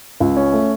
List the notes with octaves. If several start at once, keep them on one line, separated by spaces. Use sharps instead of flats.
C#2
C#4
A3